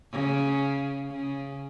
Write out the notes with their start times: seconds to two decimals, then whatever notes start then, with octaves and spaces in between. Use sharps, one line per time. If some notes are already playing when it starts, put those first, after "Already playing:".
0.12 C#3
1.10 C#3